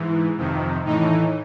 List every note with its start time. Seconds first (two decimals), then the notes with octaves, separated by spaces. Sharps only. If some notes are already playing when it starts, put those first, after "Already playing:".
Already playing: G#2 E3
0.38 F2 C3 D#3
0.85 A2 E3 D#4